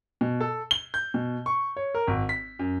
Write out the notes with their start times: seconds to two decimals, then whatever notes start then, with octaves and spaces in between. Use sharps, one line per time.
0.21 B2
0.40 A4
0.71 G7
0.94 G6
1.14 B2
1.46 C#6
1.77 C#5
1.95 A#4
2.07 G#1
2.29 B6
2.59 F#2